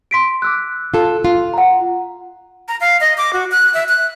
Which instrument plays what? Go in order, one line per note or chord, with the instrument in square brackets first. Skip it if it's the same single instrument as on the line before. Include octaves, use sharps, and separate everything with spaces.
[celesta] C6 B6 D7
D6 E6 F#6
[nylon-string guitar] F4 A4
F4
[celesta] F#5 A#5
[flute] A#5
F5
D#5
D6
F#4
F#6
E5
F#6